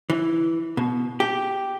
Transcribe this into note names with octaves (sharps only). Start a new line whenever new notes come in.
E3
B2
G4